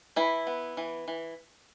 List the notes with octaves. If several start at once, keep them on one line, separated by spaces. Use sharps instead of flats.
E3 E4
B3
E3
E3